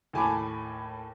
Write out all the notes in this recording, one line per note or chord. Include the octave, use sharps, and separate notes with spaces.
D#2 A2 G#5 A5 B5 D6